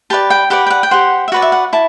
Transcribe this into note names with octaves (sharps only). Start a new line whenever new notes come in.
G4 B4 D5 A5
G5
G4 B4 D5 F#5
G5
F#5
G5
G4 C5 F#5
E5
F#4 B4 D5 F#5
E5
F#5
E4 A5